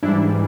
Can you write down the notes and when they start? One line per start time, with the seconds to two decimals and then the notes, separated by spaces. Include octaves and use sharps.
0.03 G#2 E3 G3 D4 E4